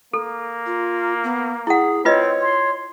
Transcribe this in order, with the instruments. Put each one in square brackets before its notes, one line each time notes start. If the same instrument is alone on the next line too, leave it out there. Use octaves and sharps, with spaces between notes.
[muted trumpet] A#3 [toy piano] A4
[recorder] F4
B3
[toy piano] E4 F#5 [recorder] G#4
[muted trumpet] C4 [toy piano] F4 B4 D#5 [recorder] C#5
[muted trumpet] C6